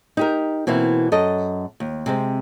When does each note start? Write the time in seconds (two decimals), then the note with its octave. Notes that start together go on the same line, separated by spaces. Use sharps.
0.17 D#4 G4 A#4
0.67 B2 E3 A#3 C4 E4
1.12 F#2 A4 D#5
1.80 D#2
2.06 C3 G#3 C4